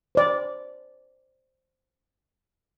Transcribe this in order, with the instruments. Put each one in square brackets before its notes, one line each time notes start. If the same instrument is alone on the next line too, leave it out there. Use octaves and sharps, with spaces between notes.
[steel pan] C5 D5